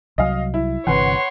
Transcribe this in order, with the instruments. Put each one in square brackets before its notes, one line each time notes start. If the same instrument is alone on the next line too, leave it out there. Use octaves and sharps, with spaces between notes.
[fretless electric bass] C2 F#3 [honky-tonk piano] D#5 F5
[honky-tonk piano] E4
[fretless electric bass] G1 C3 E3 [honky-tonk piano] B4 F#5 [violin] C#5 C6